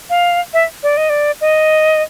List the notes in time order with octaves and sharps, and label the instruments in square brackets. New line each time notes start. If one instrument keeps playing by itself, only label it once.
[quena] F5
E5
D5
D#5
D5
D#5